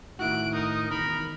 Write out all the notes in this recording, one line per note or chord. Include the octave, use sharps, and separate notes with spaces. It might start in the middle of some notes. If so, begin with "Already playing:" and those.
A2 D#3 E4 F#4 F#6 D7
D#4 A#4 D#6
E1 D#3 A#4 B5